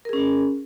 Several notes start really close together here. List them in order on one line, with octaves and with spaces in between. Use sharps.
A#4 G#4 C#4